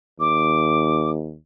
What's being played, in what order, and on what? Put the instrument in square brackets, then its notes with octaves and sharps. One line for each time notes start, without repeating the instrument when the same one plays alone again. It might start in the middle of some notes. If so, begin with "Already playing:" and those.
[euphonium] D#2 [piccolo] D6